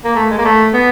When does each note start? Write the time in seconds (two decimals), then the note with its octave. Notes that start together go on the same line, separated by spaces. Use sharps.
0.04 A#3
0.16 A3
0.30 G#3
0.38 A#3
0.45 A3
0.73 B3